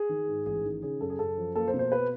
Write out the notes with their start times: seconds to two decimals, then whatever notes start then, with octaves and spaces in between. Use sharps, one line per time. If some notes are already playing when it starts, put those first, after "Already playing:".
Already playing: G#4
0.09 D#3
0.28 G#2
0.46 A1 G#4
0.65 D#3
0.82 C#3 G#4
1.01 F#2 A4
1.10 G#4
1.19 F#2 A4
1.37 F3
1.55 A#3 A4
1.68 C5
1.74 B2
1.79 C5
1.92 B4